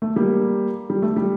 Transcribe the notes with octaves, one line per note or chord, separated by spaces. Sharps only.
A3
G3 A#3
G3
A3
G3